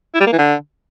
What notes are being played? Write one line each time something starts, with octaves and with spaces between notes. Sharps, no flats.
E4
G3
A#3
E3
D3